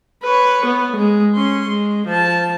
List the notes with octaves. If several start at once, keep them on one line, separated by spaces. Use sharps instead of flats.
B4 C#5
B3
G#3
C#4 C6
G#3
F3 A5